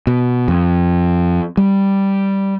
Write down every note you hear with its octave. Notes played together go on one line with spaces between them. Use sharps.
B2
F2
G3